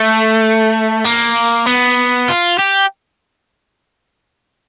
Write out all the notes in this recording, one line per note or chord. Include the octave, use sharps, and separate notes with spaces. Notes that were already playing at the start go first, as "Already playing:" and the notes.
Already playing: A3
A#3
B3
F4
G4